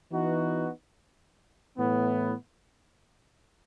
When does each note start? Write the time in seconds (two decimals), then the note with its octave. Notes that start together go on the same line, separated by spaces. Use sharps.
0.12 E3 B3 D#4 F#4
1.77 A2 E3 B3